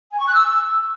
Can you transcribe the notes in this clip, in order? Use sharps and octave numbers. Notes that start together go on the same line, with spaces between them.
G#5
C#6
F#6
E6